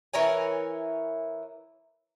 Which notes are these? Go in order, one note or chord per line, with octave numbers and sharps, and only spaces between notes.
E3 A#4 C#5 G#5